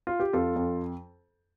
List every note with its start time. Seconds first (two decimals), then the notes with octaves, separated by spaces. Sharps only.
0.07 F4
0.20 G4
0.33 F2 F4 A4
0.56 F2